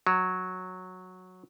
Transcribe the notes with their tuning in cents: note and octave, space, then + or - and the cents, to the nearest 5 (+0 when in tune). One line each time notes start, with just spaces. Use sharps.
F#3 -10